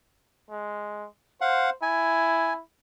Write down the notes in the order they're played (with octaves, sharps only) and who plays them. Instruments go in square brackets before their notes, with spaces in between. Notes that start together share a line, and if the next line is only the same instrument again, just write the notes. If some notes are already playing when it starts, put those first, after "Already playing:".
[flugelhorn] G#3
[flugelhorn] C5 [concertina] F5 F#5
[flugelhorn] E4 [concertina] G#5